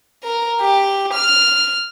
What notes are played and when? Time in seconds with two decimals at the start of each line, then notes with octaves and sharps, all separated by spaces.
0.23 A#4
0.61 G4
1.14 F6